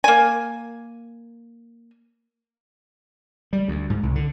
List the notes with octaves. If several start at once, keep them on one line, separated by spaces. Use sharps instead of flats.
A#3 G#5
G3
D2
G#2
C2
D3